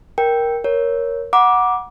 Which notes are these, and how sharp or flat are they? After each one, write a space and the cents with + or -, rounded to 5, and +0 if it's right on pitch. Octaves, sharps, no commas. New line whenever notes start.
A#4 +10 G5 +0
A#4 +10 C#5 +0
F#5 -10 A#5 +45 D6 +0